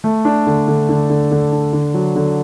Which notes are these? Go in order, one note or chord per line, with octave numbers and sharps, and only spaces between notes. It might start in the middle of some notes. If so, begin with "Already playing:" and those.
A3
D4
D3
D3
D3
D3
D3
D4
D3
F#3
D3